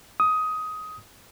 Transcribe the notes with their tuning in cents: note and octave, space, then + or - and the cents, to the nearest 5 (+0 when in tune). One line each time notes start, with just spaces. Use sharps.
D#6 +15